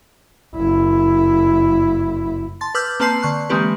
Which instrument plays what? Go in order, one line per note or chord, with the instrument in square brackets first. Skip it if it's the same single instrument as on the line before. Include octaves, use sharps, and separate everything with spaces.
[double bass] F#1 E4
[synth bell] A5 C6 A6
B4 D6 E6 F6 G6
A#3 C4 B4 A5 C6 C7
D3 C#6 F#6
E3 G#3 A#3 C4 G4 B4